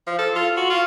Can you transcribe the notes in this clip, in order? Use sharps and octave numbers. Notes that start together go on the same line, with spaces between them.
F3
A4
F4
F#4
F4